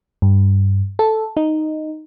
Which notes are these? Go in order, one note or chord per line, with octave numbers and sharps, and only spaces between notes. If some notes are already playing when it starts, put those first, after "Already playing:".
G2
A4
D#4